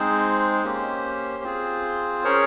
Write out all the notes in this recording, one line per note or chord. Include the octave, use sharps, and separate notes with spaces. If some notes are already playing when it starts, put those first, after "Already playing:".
Already playing: G#3 C4 D#4 G#4 C5
A#3 C#4 G4
C4 F4 G#4
C#4 G#4 A#4 C#5